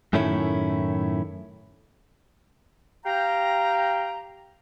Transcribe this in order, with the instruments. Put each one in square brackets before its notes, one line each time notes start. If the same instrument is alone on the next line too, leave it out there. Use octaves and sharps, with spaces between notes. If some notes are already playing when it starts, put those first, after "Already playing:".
[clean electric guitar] F#2 A2 D#3 A3 C#4 E4
[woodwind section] G4 F5 G5 A#5